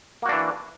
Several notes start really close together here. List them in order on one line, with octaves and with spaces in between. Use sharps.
A#3 F#4 D4 E3